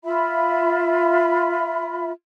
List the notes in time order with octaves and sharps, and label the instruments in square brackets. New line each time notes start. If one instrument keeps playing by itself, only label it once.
[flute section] F4 E5 B5